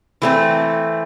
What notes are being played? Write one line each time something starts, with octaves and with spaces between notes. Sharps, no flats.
E3 A3 C4